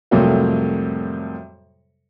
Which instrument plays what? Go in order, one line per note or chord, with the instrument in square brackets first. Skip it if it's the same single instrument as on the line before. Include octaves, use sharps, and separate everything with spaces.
[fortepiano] F2 A2 C3 F#3 G3 A#3